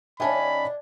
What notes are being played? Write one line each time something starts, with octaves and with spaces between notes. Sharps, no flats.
D#2 C#4 D4 D#5 E5 G#5 A5 B5